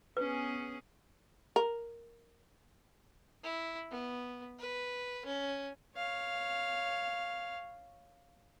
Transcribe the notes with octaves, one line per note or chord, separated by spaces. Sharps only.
B3 C#4 G#4 B4
A#4
E4
B3
B4
C#4
C#5 F5